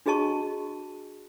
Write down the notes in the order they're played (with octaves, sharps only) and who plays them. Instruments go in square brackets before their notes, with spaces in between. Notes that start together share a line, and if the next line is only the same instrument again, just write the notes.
[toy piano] D4 F#4 G#4 D#5 A5 C#6